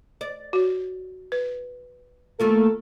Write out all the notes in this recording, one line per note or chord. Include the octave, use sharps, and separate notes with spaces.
D5
F#4 C#5
B4
D#2 A3 A#3 F4 A4